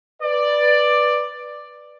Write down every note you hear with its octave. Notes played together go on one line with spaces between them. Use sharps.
B4 D5